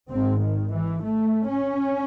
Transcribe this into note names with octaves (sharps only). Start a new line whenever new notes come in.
G#1 G#2 C4
D#3
E3
A3
C#4